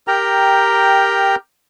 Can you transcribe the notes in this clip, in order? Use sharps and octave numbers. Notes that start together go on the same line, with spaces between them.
G4 A#4 G5 A#5